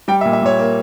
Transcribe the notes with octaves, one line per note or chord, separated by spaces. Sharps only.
G3 G5
E5
A#2
E5
A#2 C#5
A#3